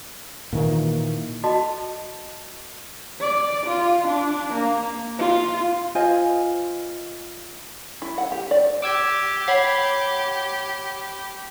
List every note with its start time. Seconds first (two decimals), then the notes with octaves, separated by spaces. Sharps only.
0.53 A#2 D#3 E3 A#3
1.43 F#4 A4 D#5 A5 B5
3.20 D5
3.67 F4
4.08 D4
4.53 A#3
5.19 F4
5.95 F4 C5 D#5 G#5
8.02 E4
8.18 F#5
8.32 G4
8.51 D5
8.82 G4 D6 E6 G#6
9.48 C#5 F#5 B5 G#6 C7